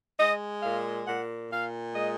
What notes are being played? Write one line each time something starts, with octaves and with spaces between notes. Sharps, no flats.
G#3 D#5
A#2 F5
A#2 F#5
A#2 F5
G#3 D#5